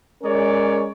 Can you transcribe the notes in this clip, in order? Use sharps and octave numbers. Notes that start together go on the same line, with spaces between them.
G#3 C#4 A#4 C#5 D5